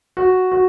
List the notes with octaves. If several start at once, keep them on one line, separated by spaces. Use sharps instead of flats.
F#4
F#4